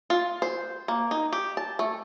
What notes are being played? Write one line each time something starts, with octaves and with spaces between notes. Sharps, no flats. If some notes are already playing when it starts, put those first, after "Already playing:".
F4
C5
A#3
D#4
G4
A5
A3